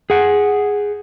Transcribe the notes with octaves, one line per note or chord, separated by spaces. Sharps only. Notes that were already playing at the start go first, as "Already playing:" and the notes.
G#4 F#5